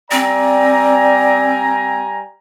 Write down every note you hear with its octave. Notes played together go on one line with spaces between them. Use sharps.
G3 C4 D5 G#5 A#5